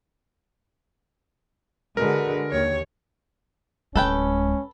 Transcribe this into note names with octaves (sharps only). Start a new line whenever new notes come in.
D3 G#3 F#4 A#4 B4
D#2 C#5
D1 G#3 C#4 A4 B4 G5